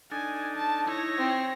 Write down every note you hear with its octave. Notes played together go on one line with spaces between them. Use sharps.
D4 D#4 A4 G#5
A5
D#4 E4 C#5 A#6
C4